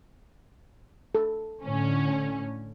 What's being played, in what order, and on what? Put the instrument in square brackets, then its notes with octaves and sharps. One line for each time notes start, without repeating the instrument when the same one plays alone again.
[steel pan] A4
[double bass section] A2 D3 [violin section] C#4